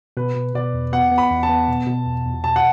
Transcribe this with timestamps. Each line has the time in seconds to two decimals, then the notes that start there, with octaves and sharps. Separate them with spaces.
0.17 B2 B4
0.36 B2
0.55 B2 D5
0.74 E2
0.93 B3 F#5
1.11 B3
1.18 B5
1.31 E2
1.43 A5
1.49 B3
1.68 B2
1.87 B2
2.06 E2
2.25 E2
2.44 B2 A5
2.56 F#5